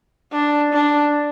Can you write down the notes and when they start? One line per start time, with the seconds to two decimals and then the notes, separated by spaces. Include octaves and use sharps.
0.32 D4
0.73 D4